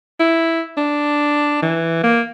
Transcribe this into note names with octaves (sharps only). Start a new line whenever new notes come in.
E4
D4
E3
A#3